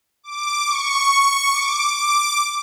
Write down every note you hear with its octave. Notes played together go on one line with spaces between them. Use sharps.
D6
C#6
D6
D6